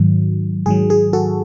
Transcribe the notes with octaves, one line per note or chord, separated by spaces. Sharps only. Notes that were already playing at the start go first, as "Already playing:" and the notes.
Already playing: G#2 D#3 F#3
G#2 D#3 F#3 G#4
G#4
F#4 A4